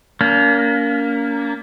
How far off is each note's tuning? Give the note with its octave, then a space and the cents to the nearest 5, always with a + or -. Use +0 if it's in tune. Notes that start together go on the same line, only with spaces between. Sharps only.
A#3 +0 C#4 +45